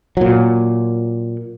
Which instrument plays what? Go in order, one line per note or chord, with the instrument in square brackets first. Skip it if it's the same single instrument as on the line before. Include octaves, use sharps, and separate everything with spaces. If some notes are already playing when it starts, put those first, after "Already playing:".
[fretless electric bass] A#2 F#3